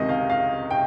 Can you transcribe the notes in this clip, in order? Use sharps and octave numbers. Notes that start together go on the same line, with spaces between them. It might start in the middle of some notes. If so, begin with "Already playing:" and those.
Already playing: C#2 C3 D#3 D#5
F5
F5
G5